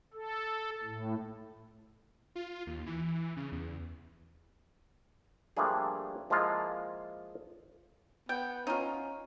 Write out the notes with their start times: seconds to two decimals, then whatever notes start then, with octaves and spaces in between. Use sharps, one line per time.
0.13 A4
0.83 A2
2.36 F4
2.67 D#2
2.86 E3
3.37 C#3
3.52 E2
5.57 F3 G3 A3 A#3 D4 G#4
6.30 F3 G#3 A#3 E4 F4
8.29 B3 G5
8.67 C#4 D#4 F4